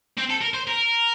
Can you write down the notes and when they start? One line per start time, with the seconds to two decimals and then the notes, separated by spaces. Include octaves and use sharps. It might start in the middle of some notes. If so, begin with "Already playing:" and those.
0.18 C4
0.30 A4
0.42 A#4
0.54 C5
0.67 A#4